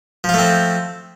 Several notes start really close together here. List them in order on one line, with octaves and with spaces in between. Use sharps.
F3 F4 A3 C4